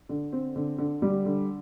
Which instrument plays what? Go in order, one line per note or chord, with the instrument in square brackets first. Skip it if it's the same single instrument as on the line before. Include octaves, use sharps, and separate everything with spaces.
[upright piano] D3
C4
D3
D3
G3
D3